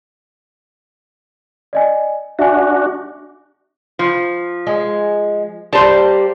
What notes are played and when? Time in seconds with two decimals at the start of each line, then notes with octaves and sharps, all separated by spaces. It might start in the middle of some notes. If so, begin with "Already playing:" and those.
1.73 D5 D#5 G#5
2.39 D4 F#4 E5 G#5
3.99 F3
4.67 G#3
5.73 G3 A#3 C5 A5